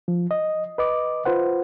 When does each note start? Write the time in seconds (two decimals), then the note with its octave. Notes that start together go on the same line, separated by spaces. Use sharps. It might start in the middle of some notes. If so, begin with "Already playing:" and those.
0.08 F3
0.31 D#5
0.78 B4 D#5 D6
1.25 F4 B4 C5 F#5